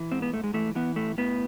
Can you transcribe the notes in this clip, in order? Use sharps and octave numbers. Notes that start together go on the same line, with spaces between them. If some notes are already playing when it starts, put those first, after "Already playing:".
Already playing: E3
G#2 C4
B3
G#2 A3
G#3
E3 A3
E3 B3
A2 A3
A2 B3